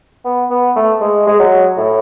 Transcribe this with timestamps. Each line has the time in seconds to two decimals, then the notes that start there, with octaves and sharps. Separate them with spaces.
0.25 B3
0.50 B3
0.76 A3
1.01 G#3
1.27 G#3
1.40 F#3
1.77 A2